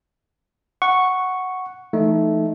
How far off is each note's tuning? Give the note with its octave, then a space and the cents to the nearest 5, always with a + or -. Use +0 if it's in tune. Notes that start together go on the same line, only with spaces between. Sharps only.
F#5 +0 C#6 +0
E3 +30 A3 -5 D#4 +0